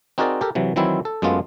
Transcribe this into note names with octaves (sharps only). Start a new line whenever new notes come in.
C4 D#4 F#4 G#4 A#4 D5
G4 A4 A#4
C3 E3 F#3
D#3 E3 F#3 C4 E4
A4
F#2 G#3 A3 B3 F4